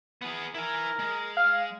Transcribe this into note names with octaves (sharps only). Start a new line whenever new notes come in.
B3 G#4
E4 A#4 G#5
G#3
F5